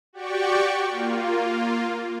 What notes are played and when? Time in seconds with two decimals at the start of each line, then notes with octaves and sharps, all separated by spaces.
0.13 F#4 G4 D5 G5 C#6
0.85 A#3 F4